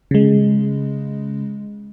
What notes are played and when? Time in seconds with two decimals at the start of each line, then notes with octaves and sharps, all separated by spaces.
0.11 C#3 G#3